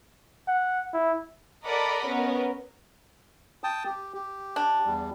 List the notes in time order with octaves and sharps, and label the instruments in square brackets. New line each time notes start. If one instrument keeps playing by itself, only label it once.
[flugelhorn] F#5
E4
[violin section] A4 A#4 D5 D#5 F#5 B5
B3 C#4 A#4
[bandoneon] G5 A5 D#6
G4
G4
[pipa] D4
[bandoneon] E2 G3